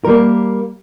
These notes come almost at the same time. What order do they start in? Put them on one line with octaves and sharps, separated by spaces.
A#4 G3 A#3